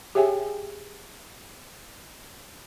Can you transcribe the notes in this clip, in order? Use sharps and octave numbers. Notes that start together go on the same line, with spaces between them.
G4 G#4 C#5 E5 G5 G#5